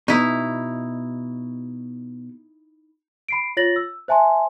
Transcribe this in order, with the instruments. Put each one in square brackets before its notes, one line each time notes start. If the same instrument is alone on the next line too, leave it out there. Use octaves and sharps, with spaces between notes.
[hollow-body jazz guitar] B2 [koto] D#4 E4
[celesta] B5 C7 D7
F4 C#5 A6 A#6 F#7
E6
C5 E5 G#5 A5 C6